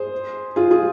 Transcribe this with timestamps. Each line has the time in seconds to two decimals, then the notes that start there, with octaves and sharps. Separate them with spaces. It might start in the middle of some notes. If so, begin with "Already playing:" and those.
Already playing: G#4 C5
0.56 F4 G#4
0.71 F4 G#4